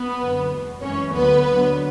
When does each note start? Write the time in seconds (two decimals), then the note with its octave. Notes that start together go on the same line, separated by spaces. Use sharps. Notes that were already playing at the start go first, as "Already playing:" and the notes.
Already playing: B3 B4
0.20 F#2 D3 F#3
0.51 E2 B2 G#3
0.82 F#2 E3 G#3 C#4 C#5
1.14 D2 D3 F#3 B3 B4
1.45 D2 D3 F#3